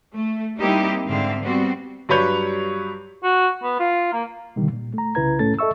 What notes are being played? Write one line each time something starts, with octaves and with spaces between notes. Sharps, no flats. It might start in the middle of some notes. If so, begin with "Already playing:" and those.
A3
G3 A#3 C4 D#4 E4 G4
G#2 D3 C4 E5 F5
G3 B3 C4 F#4
G2 F#3 G3 B4 C#5 G6
F#4
B3
F4
A#3
B2 D3 D#3 G3
A#2
A3 A#5
C2 C#3 E4 B4 A#5 G#6
A2 A3 C#4 A4 A6
A4 D#5 E5 C#6 E6